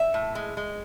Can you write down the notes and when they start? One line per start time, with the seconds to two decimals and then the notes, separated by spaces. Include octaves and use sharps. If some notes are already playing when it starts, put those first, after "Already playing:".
Already playing: E5
0.14 A2
0.35 G#3
0.57 G#3